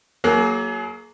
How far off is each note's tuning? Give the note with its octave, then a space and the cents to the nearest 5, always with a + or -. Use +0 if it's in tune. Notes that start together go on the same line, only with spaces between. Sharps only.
F#3 +0 A#3 +0 G#4 +35